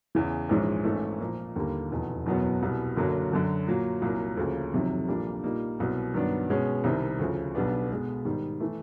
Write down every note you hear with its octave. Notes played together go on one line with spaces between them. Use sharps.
E2 C#3 E3
A#1 G#2 E3 G#3 C#4
G#1 G#2 E3 A3 C#4
A#2 F3 A#3
D#2 D3 G3 A#3
F1 E2 B2
F#1 E2 B2 F#3 B3
C2 B2 G3
F#1 F#2 D3 F#3 A#3
F#2 D3 F#3
A#2 F#3 A#3
C2 A#2 F#3 A#3
D2 C#3 F3 A#3
F#1 F2 C3 D#3 F#3
A#1 A#2 G3 A#3 D4
A#2 G3 A#3 D#4
C2 B2 F#3
G2 D#3 F#3 B3 D4
B2 G#3 C#4
C2 C3 D#3 G3 C4
D2 C#3 F3
B1 B2 G3 B3 D4
B2 G#3 B3
G#2 D#3 G3
E3 A3